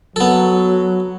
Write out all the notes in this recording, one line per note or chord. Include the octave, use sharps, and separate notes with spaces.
F#3 B3 A4